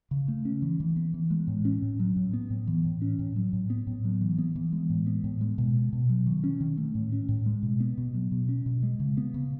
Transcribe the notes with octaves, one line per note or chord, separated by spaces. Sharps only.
C#3
A3
C#4
E3
E3
B3
E3
G#3
A2
C#4
A2
F#3
A2
B3
A2
E3
A2
C#4
A2
F#3
A2
B3
A2
F#3
E3
B3
E3
G#3
A2
B3
A2
G#3
B2
B3
B2
F#3
D#3
C#4
D#3
A3
A2
C#4
A2
G#3
B2
B3
B2
F#3
B2
C#4
B2
G#3
C#3
B3
C#3